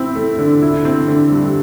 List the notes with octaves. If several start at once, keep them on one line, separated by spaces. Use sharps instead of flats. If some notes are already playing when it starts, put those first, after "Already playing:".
Already playing: C4 E4
A3
D3
E4
C4
D3
G2